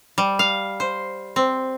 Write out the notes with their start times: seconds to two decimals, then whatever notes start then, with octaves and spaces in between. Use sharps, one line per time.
0.18 G3
0.39 F5
0.80 C5
1.36 C4